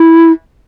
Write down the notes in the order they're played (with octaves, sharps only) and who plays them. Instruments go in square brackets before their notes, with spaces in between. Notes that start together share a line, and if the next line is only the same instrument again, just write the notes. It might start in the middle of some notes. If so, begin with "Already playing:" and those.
Already playing: [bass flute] E4